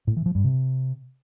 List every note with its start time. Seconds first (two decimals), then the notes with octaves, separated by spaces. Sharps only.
0.07 A2
0.17 E3
0.26 F3
0.35 G2
0.44 C3